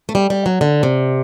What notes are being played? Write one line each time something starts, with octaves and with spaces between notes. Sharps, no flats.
A3
G3
G3
F#3
D3
C3